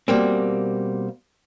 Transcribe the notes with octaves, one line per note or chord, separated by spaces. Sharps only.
B2 G3 A#3 C4